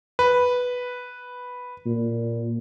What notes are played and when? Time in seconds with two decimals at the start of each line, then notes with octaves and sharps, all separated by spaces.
0.19 B4
1.86 A#2